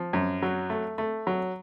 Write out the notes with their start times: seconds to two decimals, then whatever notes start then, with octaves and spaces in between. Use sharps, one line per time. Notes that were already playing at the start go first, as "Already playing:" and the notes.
Already playing: F3
0.13 F#2
0.42 F#3
0.70 A3
0.98 A3
1.27 F#3